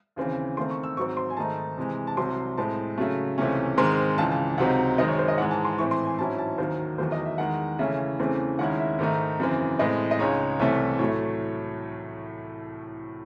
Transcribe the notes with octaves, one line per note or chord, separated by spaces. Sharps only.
D#2 C#3 E3 C4
D#2 D#3 A3 C4 C6
C#6
E6
G#2 F#3 C4 C#6
C6
G#5
G#2 D#3 A3 D#4 A5
C3 E3 G#3
A5
C2 C3 F#3 C4 C6
A2 G#3 C4 A5
C#3 F#3 A3
C#2 C3 E3 A3 C#4
G#2 D#3 G#3 C4 C6
C#2 C#3 E3 A5
A5
C#2 C3 F#3 C4 D#4 F#5
F#2 D#3 G#3 C4 D#5
C#5
C5
D#5
G#2 E3 G#3 F#5
A5
C6
A2 E3 C4 E4 C#6
C6
G#5
G#2 F#3 C#4 E4 A5
A5
D#2 D#3 F#3 C5
E2 D#3 F#3 A3 C5
D#5
E5
E2 D#3 G#3 F#5
C#3 E3 A3 C#4 E4 E5
E2 C#3 E3 A3 C4
D#2 D#3 G#3 C#4 E4 F#5
E5
G#2 D#3 A3 D#4
F#2 C#3 E3 C4
A2 G#3 C4 D#5
D#5
C#2 C#3 G#3 D#4 C#5
C2 C3 E3 A3 C#5
A2 F#3 A3 C#5